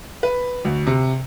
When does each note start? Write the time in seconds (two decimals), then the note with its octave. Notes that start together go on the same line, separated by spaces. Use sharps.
0.23 B4
0.65 D2
0.87 C3